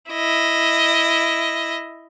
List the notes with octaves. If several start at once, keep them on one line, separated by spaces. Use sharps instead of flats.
E4 D#5